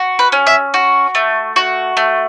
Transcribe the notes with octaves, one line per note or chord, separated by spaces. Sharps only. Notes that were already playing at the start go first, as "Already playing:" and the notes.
Already playing: F#4
B4
C#4
E5
F#4
A3
F#4
A3